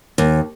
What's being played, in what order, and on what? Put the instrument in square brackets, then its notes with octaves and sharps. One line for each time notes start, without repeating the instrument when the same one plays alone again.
[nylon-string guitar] D#2